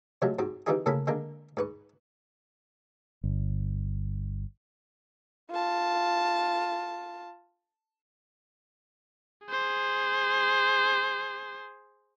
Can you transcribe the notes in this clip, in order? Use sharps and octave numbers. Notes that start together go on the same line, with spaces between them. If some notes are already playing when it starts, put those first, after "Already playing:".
C3 F3 F#3 G#3 A3
G#2 C4 F#4
E3 G3 C4 D#4 F4 G#4
A2 C#3 A#3 C#4 A4 B5
D3 G#3 A#3 D4
G#2 B4 C#6
G1
F4 A5
G#4 C5